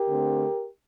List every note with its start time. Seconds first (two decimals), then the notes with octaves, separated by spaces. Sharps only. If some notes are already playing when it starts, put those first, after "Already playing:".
Already playing: G4 A#4
0.08 D3 A3 C4